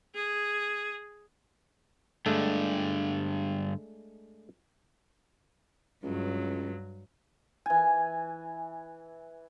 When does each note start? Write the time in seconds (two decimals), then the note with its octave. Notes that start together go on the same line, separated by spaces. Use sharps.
0.15 G#4
2.26 G2 D3 G#3 A3 D4
6.03 C#2 G2 F#3
7.66 E3 G#5